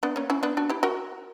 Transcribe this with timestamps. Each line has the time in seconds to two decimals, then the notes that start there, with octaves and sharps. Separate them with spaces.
0.03 B3 D4
0.16 A#3 C#4
0.30 C#4 E4
0.43 B3 D4
0.57 D4 F#4
0.70 E4 G4
0.83 F#4 A#4